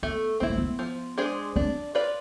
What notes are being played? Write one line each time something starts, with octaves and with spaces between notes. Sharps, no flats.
A3 B3
B3 C4 E4
A3
B3
F3
G#3 D4 G#4 C5
C4 D4
F4 B4 D5